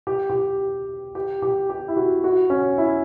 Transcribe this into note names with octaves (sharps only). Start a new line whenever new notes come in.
G4
G4
G4
G4
G4
E4
F#4
F#4
C#4
E4